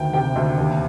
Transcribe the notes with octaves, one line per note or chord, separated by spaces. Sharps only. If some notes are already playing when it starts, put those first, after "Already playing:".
Already playing: D2 D#3 G5
C3 G5
D2
D#2